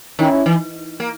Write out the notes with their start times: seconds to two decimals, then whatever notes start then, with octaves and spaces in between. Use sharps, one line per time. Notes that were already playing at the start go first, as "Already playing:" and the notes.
0.19 D#3 C#4 E4
0.46 E3
1.00 A#3